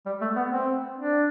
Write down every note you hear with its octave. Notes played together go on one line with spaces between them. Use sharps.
G3
A3
B3
C4
D4